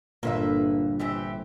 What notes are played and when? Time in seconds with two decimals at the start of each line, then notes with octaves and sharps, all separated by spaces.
0.23 G1 A#2 A#3 B4 E5
1.00 E3 C4 G4 E5